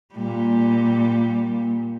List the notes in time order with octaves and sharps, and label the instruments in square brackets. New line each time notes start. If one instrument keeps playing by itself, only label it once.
[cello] A#2 G3